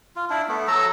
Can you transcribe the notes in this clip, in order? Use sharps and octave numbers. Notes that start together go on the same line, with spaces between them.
F4
D4 E4
A3 B3
F#3 A4 A#5 E6